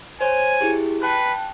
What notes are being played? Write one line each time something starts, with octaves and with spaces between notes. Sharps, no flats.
C5 C#5 G#5
E4 G4 G#4
B4 G5 A5 F#6